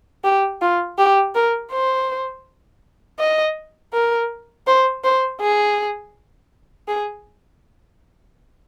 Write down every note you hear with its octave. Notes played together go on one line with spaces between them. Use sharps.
G4
F4
G4
A#4
C5
D#5
A#4
C5
C5
G#4
G#4